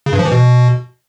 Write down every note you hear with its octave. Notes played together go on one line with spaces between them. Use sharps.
C#3
G2
F3
E3
B2